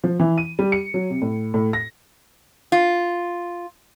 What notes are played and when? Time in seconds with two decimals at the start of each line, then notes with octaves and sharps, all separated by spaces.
0.04 F3
0.20 E3
0.38 D#7
0.59 G3
0.72 C#7
0.94 F#3
1.10 C3
1.22 A2
1.54 A2
1.73 A#6
2.72 F4